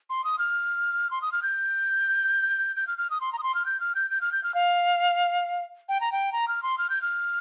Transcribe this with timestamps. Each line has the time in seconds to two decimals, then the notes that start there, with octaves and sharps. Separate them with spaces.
0.10 C6
0.24 D#6
0.39 F6
1.11 C6
1.22 D#6
1.32 F6
1.43 G6
2.76 G6
2.87 F6
2.98 F6
3.10 D#6
3.21 C6
3.33 A#5
3.39 D#6
3.43 C6
3.55 F6
3.66 G6
3.80 F6
3.95 G6
4.11 G6
4.21 F6
4.32 G6
4.43 F6
4.54 F5
5.89 G5
6.01 A#5
6.12 G5
6.33 A#5
6.48 F6
6.63 C6
6.78 F6
6.90 G6
7.02 F6